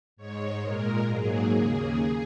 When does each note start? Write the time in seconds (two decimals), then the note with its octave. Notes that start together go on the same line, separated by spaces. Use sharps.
0.17 G#2 G#3 C#5
0.62 A#2 G#3 A#4
1.08 G#2 F#3 A#3 G#4
1.54 D#2 C#3 A#3